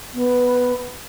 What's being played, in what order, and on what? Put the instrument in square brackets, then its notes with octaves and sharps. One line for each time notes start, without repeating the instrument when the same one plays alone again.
[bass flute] B3